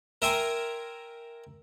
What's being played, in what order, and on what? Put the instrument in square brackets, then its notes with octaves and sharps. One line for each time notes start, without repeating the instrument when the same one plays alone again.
[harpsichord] A#4 E5 G5 G#5 A#5 C6